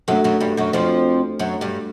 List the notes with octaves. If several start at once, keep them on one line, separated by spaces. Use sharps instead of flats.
F#2 F#3 A3 D4 F#4 A4
F#2 F#3
G2 G3
F#2 F#3
F2 F3
F#2 F#3
G2 G3